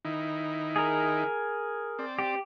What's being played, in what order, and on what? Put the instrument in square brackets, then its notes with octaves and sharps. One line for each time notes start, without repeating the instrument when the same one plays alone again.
[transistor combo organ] D#3 D#4 E4
[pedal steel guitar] G#4 A#4
[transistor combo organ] C4 D5
[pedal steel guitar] G4